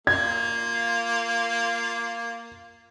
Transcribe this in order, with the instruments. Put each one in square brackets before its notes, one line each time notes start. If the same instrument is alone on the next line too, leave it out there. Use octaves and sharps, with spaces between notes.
[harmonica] A#3 F4 [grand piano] G#6